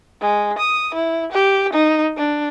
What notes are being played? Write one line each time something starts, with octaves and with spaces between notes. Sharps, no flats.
G#3
D#6
E4
G4
D#4
D4